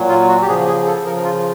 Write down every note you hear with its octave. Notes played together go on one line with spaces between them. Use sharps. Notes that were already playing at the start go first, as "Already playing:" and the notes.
Already playing: A#2 F#3
F4
F#4
G4
C#3 F3 G#4
G#4
A4
C#3 F3 A#4
F4